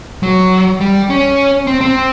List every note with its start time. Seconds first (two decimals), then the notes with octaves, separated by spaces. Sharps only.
0.23 F#3
0.81 G3
1.10 C#4
1.67 C4
1.81 C4